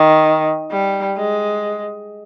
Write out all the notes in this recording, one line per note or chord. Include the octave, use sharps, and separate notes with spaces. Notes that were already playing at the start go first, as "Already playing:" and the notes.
Already playing: D#3
G3
G#3